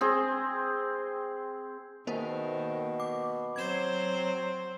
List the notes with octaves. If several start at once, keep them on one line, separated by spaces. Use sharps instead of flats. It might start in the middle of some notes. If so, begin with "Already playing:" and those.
C4 G#4
B2 D#3 A#3 A#4 C5
D6
F#3 C4 C5 G#6 E7